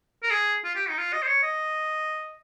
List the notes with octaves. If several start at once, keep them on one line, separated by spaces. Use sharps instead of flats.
A#4
G#4
F4
G4
D#4
F4
D#5
C5
C#5
D#5